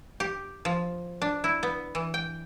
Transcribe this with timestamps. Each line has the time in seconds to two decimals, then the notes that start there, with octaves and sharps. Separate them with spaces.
0.20 G4
0.65 F3
1.22 D4
1.44 E4
1.63 B3
1.95 E3
2.14 G5